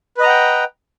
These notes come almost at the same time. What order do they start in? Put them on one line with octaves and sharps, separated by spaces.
B4 D#5 A#5 F#5 G5